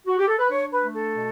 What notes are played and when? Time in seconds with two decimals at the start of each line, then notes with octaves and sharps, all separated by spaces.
0.07 F#4
0.18 G4
0.28 A4
0.39 B4
0.49 D4 C#5
0.71 B4
0.82 A3
0.93 A4
1.15 B2